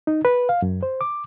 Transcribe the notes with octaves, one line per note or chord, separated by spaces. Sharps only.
D#4
B4
F5
F#2
C5
D6